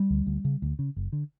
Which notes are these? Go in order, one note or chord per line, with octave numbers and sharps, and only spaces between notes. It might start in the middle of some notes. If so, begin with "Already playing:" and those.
Already playing: G3
D2 D3
D2
C#3
D2
C#3
F#1
D3